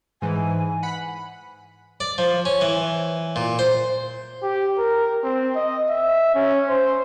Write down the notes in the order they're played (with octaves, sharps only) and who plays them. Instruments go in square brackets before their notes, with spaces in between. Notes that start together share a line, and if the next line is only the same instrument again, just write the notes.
[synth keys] G#2 E3 [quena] G#5
[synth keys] F#5 B5
[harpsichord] D5
F3
C#4
E3
A#2
C5
[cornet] G4
A#4
C4
D#5
E5
C#4
C5